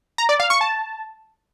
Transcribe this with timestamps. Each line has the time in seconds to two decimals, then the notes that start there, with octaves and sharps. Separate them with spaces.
0.18 A#5
0.29 D5
0.40 F5
0.50 C#6
0.61 A5